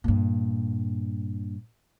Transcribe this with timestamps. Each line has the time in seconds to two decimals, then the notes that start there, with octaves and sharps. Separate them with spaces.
0.04 G2 A#2